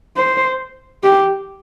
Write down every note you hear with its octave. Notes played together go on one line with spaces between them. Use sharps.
C5
G4